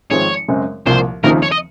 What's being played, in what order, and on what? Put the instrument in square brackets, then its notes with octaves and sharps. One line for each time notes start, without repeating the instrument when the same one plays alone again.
[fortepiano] G#1 G#2 F3 G#3 C4 [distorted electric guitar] C#5
[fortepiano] F#2 C#3 G#3 C4
[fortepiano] C2 A#2 F3 A#3 [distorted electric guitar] C5
[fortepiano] D#2 C#3 F3 C4 D#4 [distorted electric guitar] A#4
[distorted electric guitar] C#5
D#5